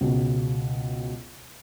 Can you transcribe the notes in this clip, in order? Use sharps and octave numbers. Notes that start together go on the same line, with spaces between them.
C#2 B2